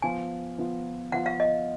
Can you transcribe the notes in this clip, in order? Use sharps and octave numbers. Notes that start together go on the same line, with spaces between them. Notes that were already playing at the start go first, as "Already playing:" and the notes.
F3 B3 F4 G#5
F3 B3 F4
F3 B3 F4 F#5
F5
D#5